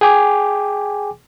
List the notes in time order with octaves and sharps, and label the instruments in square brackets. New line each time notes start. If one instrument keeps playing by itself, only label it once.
[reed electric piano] G#4 G5 G#5 D6